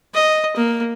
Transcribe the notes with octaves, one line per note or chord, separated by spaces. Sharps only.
D#5
A#3